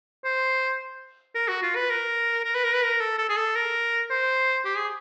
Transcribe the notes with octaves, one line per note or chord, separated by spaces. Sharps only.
C5
A#4
F#4
F4
B4
A#4
A#4
B4
A#4
B4
A#4
A4
A4
G#4
A4
A#4
C5
G4
G#4